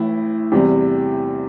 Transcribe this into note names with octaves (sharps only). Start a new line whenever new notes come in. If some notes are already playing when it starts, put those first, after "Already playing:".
Already playing: A1 A2 E3 E4
E2 C3 G3